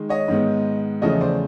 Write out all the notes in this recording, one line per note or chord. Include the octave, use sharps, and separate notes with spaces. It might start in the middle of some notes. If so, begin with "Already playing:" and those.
Already playing: D#3 G#3
C#5 D#5
G#2 D#3 G#3 B3
E2 C#3 F3 A3 C#5 D#5
C5 D5